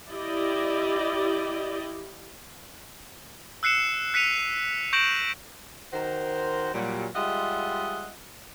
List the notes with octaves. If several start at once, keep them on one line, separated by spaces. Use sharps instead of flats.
E4 G4 D5 D#5
E6 F#6 C7 C#7 E7
F#6 B6 C#7 D#7 F7
C#6 G6 A#6 D7 E7 F#7
D#3 F#4 A#4 C5
A#2 F#3 G3
G3 G#3 F4 D#5 E5 F#5